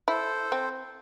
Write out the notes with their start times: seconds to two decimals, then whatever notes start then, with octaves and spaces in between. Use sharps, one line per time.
0.08 E4 A4 C5
0.52 C4